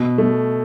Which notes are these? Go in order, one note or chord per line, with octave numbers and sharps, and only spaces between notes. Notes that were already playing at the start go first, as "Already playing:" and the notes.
Already playing: B2
A3